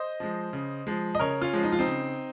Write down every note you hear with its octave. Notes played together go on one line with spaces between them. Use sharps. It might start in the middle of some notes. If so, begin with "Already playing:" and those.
Already playing: C5 D#5
F3 G#3
C#3
F3 G#3
D#5
C#3 A#4 C#5
C#4 F4
F3 G#3
D#4
F4
C4 D#4
C#3